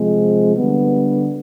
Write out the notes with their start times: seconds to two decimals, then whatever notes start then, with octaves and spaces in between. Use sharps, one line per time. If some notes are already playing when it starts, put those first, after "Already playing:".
Already playing: C3 F3 G#3 C4
0.56 D3 G3 B3